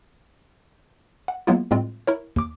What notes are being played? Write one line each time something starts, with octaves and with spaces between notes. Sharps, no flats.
F#5
F#3 G#3 A#3 B3 E4 F4
A2 G3 G#3 C4 F4
E4 A#4 C#5
D#2 D6